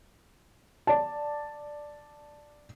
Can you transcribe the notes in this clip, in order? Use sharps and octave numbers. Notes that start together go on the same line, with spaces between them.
D5 A5